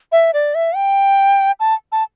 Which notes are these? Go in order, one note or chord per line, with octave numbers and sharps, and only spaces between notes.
E5
D5
E5
G5
A5
A5